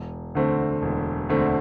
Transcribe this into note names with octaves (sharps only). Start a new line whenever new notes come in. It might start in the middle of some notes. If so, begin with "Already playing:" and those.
Already playing: E1
D2 D3 A3 C4
E1
D2 D3 A3 C4